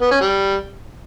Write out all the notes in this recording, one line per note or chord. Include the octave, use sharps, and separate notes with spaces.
B3
C#4
G3